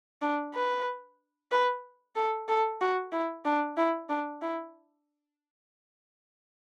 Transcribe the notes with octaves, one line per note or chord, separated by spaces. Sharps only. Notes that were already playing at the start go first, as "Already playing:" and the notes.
D4
B4
B4
A4
A4
F#4
E4
D4
E4
D4
E4